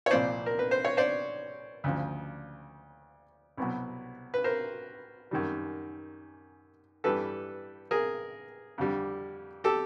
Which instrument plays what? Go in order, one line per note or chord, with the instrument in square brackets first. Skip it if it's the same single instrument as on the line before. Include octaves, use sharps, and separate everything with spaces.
[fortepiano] C#5
C2 A#2 F3 C5 D5
A#4
B4
C5
C#5
C5 D5
D2 C#3 F3
C2 B2 F#3
B4
A#4 C5
F#2 D#3 G3
G2 E3 G3 A4 B4
G#4 A#4
F2 D3 G3
G4 A4